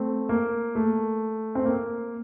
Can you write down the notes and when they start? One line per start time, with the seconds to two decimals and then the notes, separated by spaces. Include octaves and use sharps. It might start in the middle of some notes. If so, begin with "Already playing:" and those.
Already playing: A3 C4
0.29 A#3
0.75 A3
1.55 C4
1.65 A#3